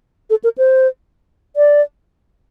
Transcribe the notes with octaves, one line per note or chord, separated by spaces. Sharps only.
A4
A#4
C5
D5